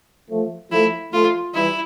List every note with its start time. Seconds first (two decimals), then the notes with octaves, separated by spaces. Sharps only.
0.30 F3 A3
0.71 F3 A3 E4
1.13 F3 A3 F4
1.54 E3 G3 E4